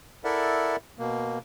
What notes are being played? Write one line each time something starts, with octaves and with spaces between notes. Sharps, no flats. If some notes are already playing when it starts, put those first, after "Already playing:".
E4 A4 A#4 D5 E5 F#5
B2 A#3